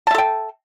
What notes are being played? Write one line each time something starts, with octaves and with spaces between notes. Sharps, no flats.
A4 E5 G5 A5